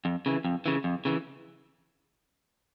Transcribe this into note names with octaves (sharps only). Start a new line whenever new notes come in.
F2
C#3 E3
F2
C#3 E3
F2
C#3 E3